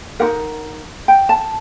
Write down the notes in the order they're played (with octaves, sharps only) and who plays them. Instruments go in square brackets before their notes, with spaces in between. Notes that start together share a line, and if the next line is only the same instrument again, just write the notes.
[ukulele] D#4 F#4 A#4 F#5
G5
A5